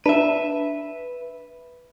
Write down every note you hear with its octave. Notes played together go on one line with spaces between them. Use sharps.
D4 B4 E5